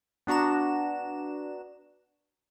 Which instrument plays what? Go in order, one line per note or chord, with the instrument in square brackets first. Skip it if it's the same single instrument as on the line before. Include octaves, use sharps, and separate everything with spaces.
[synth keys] B3 D4 F#4 A#5 E7